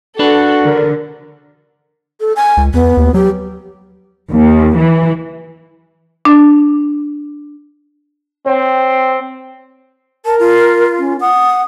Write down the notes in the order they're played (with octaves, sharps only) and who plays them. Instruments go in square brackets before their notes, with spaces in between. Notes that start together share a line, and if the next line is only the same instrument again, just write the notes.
[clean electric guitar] D4 B4 [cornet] F#4 [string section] A4
[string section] D3 [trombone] A#4
[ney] A4
G#5
[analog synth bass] C#2
[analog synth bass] E2 [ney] B3
[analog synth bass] D#2
[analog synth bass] F#3 [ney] G4
[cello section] D#2
E3
[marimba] D4
[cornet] C4 [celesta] C#5 G5
[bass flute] A#4 [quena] A5
[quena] F4
[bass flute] C#4
[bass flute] F#5 [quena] D#6